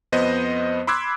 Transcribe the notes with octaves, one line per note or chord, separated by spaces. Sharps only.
F2 B3 C5 D#5
B5 C6 D6 E6 F#6 G#6